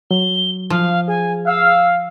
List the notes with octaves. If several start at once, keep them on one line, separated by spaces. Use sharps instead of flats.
F#3 G7
F3 F5
G#4 G#5
F5 E6